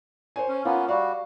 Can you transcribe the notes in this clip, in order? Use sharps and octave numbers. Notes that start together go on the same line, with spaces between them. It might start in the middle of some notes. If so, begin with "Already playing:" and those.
C5 C#5 G#5
C#4
A#3 B3 C#4 F4
G3 F#4 F5